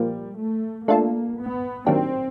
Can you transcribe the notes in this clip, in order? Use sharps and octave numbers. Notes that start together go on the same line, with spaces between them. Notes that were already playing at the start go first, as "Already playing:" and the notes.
Already playing: A#2 F3 G3 A#3
A3
A3 A#3 D4 F4 A4
B3
D#3 F#3 A#3 C4 D4 G4